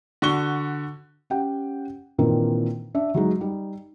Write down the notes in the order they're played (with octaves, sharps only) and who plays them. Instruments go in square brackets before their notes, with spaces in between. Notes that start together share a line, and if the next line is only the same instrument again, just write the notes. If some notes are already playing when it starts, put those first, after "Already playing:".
[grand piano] D3 F#4 C#6 G7
[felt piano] C#4 G4 F#5 G5
A#2 D#3 E3 C4 D4 A#4
D4 E5
F#3 G#3 D#4
G3 D#4